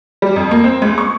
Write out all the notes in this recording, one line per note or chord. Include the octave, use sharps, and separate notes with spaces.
G3
F2
A#3
C4
C#2
C#6